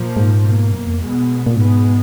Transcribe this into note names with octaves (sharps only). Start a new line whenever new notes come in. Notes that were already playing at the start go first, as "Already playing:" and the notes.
Already playing: A#2 F3 A#3
G#2
B2 A#3
F#2
F2
B2 G#3 B3
A#2
G#2 B2 G#3 B3